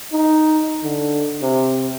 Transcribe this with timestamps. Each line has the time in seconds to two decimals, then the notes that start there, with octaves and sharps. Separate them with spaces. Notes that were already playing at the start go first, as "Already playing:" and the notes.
0.12 D#4
0.83 D3
1.42 C3